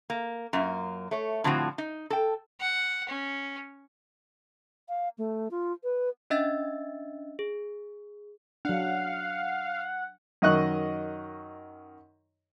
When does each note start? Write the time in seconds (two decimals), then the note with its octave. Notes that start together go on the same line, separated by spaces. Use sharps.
0.10 A#3
0.53 F#2 A#3 F4
1.11 A3 C#5
1.44 A2 D3 F3 C4 F#4
1.78 D#4
2.10 A4 G5
2.60 F#5
3.09 C#4
4.89 F5
5.18 A3
5.51 F4
5.84 B4
6.30 C#4 D4 D#5 E5 E6 A6
7.39 G#4
8.65 F#3 D4 F5 F#5
10.42 F#2 D#3 D#5 C#6 F#6